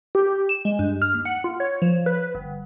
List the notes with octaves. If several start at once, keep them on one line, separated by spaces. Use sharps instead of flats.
G4
E7
G#3
G2
F6
D#2
F#5
F4
C#5
F3
B4
G1